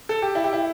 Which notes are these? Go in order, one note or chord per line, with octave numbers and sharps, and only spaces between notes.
A4
G4
E4
G4
E4